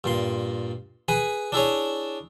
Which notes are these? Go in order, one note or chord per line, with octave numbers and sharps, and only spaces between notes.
G2 A#2 C6
G#4 B4 G#5
D4 E4 G#4 C#5